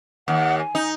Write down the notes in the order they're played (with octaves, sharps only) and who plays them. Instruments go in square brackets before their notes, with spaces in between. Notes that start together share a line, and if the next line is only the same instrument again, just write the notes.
[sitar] D#2 [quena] F#5
[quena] G#5
[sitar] D#4